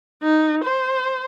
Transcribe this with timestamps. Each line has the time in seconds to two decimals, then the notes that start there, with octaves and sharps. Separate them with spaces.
0.23 D#4
0.65 C5